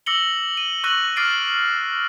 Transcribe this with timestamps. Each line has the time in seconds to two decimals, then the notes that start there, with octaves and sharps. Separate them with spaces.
0.06 D6 E6 A#6 C#7 F#7 G7
0.57 D#7
0.84 C#6 E6 F#6 A#6 D#7 F#7
1.16 D6 F6 A6 C7 D7 D#7